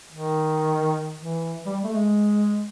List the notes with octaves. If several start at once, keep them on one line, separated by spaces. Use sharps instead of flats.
D#3
E3
G3
A3
G#3